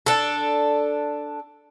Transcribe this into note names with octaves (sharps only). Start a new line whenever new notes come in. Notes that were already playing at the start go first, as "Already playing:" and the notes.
D4 A4